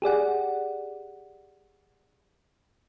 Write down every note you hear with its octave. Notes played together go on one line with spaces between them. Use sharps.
G4 G#4 D5 F#5